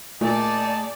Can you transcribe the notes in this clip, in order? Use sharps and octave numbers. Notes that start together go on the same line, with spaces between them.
A#2 A3 D#4 G#4 D5 A5